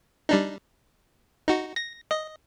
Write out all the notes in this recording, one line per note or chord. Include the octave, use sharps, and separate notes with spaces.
G3 D4 D#4
D#4 F#4
A#6
D#5